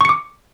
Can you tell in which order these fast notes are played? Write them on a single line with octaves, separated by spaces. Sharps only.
C#6 C#7 D6